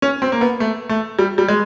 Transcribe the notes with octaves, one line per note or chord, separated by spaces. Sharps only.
C#4
C4
A#3
B3
A3
A3
G3
G3
G#3